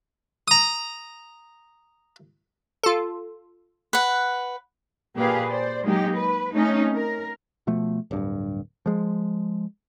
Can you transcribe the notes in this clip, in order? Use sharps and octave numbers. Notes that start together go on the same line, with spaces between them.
A#5 D#6
F4 A4
B4 F#5
A#2 G4 G#4 B4 F5
C5 D5
F#3 G#3 A#3 D#4 G4
B4
A3 C4 C#4 D#4
A#4
B2 F3 A3
D1 G2
F3 G#3